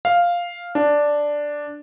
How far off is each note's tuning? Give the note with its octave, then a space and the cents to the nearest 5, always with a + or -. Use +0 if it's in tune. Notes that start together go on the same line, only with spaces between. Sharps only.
F5 +0
D4 +0